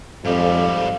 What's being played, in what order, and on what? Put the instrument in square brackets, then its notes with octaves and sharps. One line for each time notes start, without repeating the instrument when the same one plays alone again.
[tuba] F2 [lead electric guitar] G#2 G3 [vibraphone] A4 F5